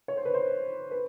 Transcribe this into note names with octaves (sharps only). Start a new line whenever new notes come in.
C#5
C5
B4
C5
B4